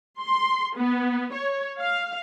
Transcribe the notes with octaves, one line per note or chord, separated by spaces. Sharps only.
C6
B3
C#5
F5